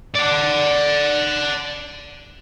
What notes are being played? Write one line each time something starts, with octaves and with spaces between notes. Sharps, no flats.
D5 F#5